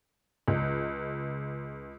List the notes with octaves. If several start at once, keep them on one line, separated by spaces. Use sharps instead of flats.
C#2